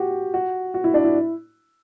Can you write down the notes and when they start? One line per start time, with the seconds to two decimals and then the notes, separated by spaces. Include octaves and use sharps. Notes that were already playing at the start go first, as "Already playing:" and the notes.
Already playing: F#4 G4
0.34 F#4
0.74 F#4
0.84 E4
0.94 D4
1.04 E4